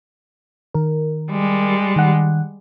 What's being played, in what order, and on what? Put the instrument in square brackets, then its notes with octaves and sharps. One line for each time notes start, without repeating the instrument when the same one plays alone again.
[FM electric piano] D#3 A#4
[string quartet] G3 G#3
[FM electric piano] D#3 F#5